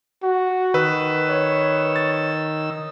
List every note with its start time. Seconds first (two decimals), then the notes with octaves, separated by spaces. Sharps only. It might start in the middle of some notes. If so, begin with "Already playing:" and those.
0.23 F#4
0.74 D#3 B4 E6
1.30 C#5
1.96 A6